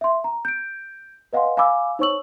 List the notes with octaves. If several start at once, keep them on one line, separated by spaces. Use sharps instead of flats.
E5 C6
A#5
G6 D7
B4 D#5 F5 F#5 G#5 C6
F5 G#5 B5 D6 E6
D#4 C5 C#5 C#6 E6 F#7